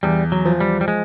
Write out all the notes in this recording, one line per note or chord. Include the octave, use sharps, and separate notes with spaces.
E2 G3
F#3
F3
G3
G3
G#3